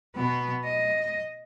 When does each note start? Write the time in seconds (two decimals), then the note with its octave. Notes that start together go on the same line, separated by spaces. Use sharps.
0.16 B2 B3
0.65 D#5